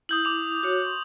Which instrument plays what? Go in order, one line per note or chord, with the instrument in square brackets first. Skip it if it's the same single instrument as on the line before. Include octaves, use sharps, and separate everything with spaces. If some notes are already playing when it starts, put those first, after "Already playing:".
[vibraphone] E4 [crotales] D#6 G6 F#7
[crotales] D6 F7
[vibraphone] F#4 C#5
C6 C#6